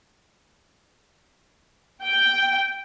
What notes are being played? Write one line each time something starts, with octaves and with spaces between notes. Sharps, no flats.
G5